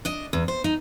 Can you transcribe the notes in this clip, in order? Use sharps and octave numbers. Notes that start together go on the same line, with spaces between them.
D4 D#5
E2
C5
D#4